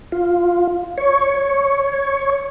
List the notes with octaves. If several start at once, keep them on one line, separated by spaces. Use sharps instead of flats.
F4
C#5